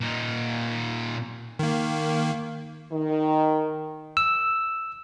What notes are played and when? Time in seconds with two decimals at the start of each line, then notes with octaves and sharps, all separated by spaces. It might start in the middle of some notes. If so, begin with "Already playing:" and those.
0.01 A#2 D#4
1.59 D#3 A#3
2.91 D#3
4.17 E6